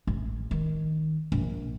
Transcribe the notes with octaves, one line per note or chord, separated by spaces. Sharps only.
A1
D#3
A#1